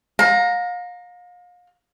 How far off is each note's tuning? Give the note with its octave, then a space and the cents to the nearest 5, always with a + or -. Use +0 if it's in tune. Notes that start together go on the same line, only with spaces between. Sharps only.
F5 +35 A#5 +0